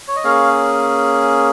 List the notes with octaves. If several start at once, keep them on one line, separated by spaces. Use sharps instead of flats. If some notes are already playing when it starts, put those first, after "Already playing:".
C#5
D#5
A#3 C#4 G#4 C#5 F5